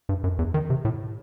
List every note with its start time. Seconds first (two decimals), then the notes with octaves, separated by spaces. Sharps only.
0.09 G2
0.24 F#2
0.39 E2
0.54 D#3
0.70 C3
0.85 A2